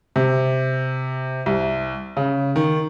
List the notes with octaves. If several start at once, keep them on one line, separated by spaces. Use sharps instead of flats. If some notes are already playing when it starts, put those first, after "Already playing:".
C3
C2
C#3
D#3